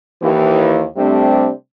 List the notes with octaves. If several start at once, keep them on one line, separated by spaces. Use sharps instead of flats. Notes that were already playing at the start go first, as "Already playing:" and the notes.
D#2 E3
C3 G3 A3 C4 D4